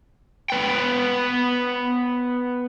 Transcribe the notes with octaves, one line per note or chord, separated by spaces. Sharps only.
B3 B4 G5